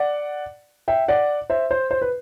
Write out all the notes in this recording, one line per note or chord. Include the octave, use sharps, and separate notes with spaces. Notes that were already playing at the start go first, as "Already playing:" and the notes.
Already playing: D5 F#5
E5 G5
D5 F#5
C5 E5
C5
C5
B4